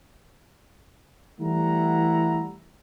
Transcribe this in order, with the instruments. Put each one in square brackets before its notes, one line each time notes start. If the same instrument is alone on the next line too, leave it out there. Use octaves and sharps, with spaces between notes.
[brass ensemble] E3 G3 A3 E4 F#5 A#5